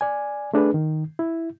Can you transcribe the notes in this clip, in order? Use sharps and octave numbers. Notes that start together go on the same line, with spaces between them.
D5 G#5
A3 D4 G#4 B4
D#3
E4